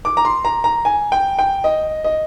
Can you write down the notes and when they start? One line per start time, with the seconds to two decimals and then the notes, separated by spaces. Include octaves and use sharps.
0.05 D6
0.17 A#5
0.25 C6
0.45 A#5
0.64 A#5
0.85 G#5
1.12 G5
1.39 G5
1.64 D#5
2.04 D#5